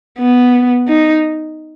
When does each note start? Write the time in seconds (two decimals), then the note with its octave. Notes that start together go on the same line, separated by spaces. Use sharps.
0.19 B3
0.88 D#4